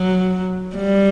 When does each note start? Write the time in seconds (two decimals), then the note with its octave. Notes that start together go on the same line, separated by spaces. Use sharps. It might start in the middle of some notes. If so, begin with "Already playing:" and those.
Already playing: F#3
0.76 G3